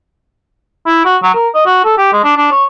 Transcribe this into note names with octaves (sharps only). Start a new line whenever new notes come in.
E4
F#4
F#3
A#4
D#5
F#4
A4
G4
G#3
D4
D4
C#5